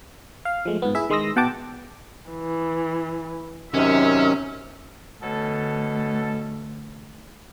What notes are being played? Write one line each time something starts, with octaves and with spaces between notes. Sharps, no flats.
F5
F3 G#3 A3
G#2 B3
E4 G#4 E5
D#3 G#3 C6 D#6 E6 A#6
B2 F#5 G5 A5 D6
E3
F#2 C3 D#3 C#4 E5
B2 D3 A3 C#4 A4